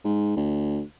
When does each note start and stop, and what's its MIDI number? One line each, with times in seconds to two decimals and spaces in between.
0.05 0.34 44
0.37 0.81 38